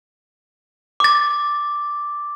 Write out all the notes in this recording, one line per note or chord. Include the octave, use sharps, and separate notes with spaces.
D6 A6